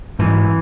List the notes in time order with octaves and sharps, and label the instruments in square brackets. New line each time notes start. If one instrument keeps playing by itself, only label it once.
[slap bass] G#2 E3